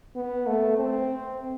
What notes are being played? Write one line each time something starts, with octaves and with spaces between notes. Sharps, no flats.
B3
A3
C4